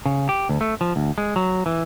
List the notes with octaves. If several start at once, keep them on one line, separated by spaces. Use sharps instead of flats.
C#3
G4
D2
A3
F3
D2
G#3
F#3
E3